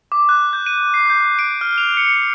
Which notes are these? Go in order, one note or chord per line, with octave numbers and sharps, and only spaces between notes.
D6
F#6
G6
D#7
C7
G6
D7
F6
F7
C#7